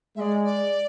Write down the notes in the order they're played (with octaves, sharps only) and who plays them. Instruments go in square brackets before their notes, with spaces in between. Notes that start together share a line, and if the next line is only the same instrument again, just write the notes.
[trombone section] G#3 [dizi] D5 E5
[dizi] D5